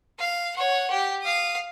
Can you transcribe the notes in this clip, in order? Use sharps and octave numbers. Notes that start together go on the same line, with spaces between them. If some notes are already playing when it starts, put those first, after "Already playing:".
F5
C#5 F#5
G4
F5 D#6